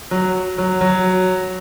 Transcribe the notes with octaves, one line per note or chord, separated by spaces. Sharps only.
F#3
F#3
F#3